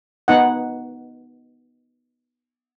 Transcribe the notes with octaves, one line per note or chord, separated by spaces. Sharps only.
B3 D#4 F#5